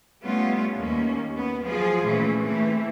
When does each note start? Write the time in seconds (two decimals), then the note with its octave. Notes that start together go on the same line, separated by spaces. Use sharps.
0.24 G3 A3 B3 C#4 F4
0.78 D#2 A#3 C#4
1.35 B3
1.64 F3 F#3 F4 G#4
2.03 A#2 E3 A3 C#4
2.41 E3 A3 C4